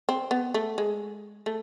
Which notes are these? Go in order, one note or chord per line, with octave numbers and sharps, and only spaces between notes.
C4
B3
A3
G#3
A3